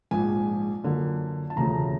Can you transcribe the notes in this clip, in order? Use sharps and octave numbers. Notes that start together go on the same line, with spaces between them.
A#1 G#2 F3 G#5
F#2 D3 F3 A#3
A5
E1 D2 C#3 F3 A3 A#5